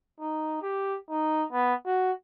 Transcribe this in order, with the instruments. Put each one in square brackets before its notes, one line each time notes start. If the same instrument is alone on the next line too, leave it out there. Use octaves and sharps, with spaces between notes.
[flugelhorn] D#4
G4
D#4
B3
F#4